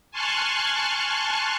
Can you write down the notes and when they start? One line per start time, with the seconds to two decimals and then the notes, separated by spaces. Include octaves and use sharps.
0.11 G#5 A5 C6 C#6 F6 F#6